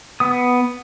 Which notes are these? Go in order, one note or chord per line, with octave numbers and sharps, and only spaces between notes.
B3 D#6